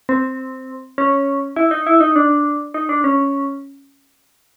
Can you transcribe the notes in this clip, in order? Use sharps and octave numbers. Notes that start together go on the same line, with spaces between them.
C4
C#4
E4
D#4
E4
D#4
D4
D#4
D4
C#4